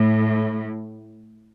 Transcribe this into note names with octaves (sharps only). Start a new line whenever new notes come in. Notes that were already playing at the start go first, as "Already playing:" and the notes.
Already playing: A2